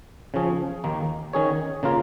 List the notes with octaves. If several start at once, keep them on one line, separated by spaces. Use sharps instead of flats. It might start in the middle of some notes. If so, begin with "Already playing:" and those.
C#3 F3 C#4 G#4
D#2 D#3 A#3
D#3 C#4 G#4 C#5
C#3 A#3 F4 A#4